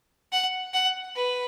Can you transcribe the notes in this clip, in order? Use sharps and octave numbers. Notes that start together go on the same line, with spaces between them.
F#5
F#5
B4